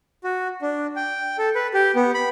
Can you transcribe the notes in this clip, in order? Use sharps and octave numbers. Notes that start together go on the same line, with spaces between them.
F#4
D4
G5
A4
B4
G4
B3
B5